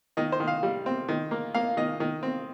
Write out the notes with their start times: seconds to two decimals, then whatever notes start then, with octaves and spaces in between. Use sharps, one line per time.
0.17 D#3 D#5
0.32 C5
0.40 D#3
0.48 F5
0.63 G3
0.86 C4
1.08 D#3
1.31 A#3
1.54 A#3 F5
1.77 D#3 D#5
2.00 D#3
2.23 C4